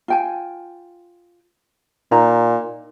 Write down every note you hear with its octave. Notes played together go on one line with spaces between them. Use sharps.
F4 G5 G#5
A#2 D#4 A#5